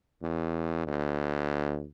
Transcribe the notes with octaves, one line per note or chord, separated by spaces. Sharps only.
E2
D2